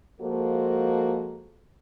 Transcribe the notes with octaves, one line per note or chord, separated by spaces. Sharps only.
F3 G#3 A#3 F#4 A4 C5